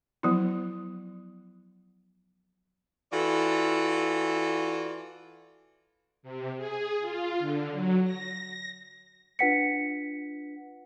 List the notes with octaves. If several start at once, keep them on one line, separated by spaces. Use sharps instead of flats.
F3 F#3 B3 E4
E3 F4 F#4 A4 D5
C3
G#4
F4
D3
F#3
A#6
D4 F4 B4 F#5 B6 C#7